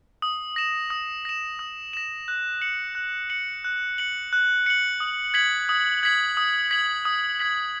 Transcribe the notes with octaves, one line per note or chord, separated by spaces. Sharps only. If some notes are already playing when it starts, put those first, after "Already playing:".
D#6
A#6 E7
D#6
A#6 E7
D#6
A#6 E7
F#6
C#7 F#7
F#6
C#7 F#7
F#6
C#7 F#7
F#6
C#7 F#7
D#6
G#6 B6 F#7
D#6
G#6 B6 F#7
D#6
G#6 B6 F#7
D#6
G#6 B6 F#7